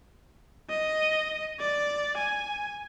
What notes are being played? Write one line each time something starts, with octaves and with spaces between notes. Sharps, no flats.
D#5
D5
G#5